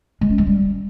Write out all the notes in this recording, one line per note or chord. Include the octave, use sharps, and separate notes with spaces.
G#3
C#4
G#3
G3